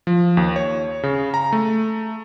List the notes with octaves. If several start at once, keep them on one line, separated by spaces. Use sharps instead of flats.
F3
D#2
C#5
C#3
A#5
A3